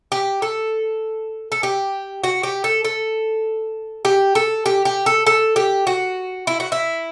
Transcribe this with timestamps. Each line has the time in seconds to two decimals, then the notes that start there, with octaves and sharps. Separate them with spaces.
0.12 G4
0.42 A4
1.52 A4
1.63 G4
2.24 F#4
2.43 G4
2.64 A4
2.85 A4
4.05 G4
4.35 A4
4.66 G4
4.85 G4
5.06 A4
5.27 A4
5.56 G4
5.87 F#4
6.47 E4
6.60 F#4
6.72 E4